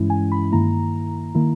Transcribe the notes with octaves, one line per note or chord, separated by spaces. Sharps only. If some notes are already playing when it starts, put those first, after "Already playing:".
Already playing: G2 E3 G#3 C#4 E4
G#5
B5
G2 D#3 A#3 E4 A#5
D#3 A#3 E4